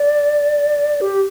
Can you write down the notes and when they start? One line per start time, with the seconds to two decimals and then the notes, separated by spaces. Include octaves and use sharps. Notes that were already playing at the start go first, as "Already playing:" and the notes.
Already playing: D5
1.01 G4